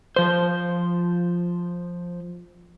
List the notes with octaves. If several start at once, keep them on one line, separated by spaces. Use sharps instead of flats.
F3 C5